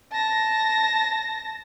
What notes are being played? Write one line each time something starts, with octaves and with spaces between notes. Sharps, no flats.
A5 A#6